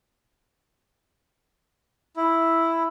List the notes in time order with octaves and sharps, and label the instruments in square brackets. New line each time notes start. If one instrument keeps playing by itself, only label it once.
[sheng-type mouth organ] E4